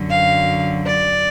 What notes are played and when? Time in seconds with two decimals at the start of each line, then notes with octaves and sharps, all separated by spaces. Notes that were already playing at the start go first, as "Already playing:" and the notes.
Already playing: F#2 D3 F#3
0.11 F5
0.87 D5